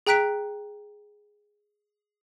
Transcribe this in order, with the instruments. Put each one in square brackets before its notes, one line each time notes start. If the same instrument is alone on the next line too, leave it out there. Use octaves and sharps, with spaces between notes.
[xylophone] G#4 G5 A#5 F#6 B6 D7